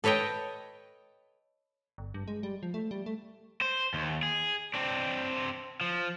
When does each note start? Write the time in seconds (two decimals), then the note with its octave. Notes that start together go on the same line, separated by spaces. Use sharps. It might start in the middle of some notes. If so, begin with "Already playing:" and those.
0.04 A4 B4 C#5 D#5 G5
1.98 G1
2.14 G2
2.28 G#3
2.43 G3
2.63 F3
2.74 A3
2.91 G3
3.06 A3
3.61 C5
3.94 D#2
4.23 G#4
4.74 C4 D4
5.81 F3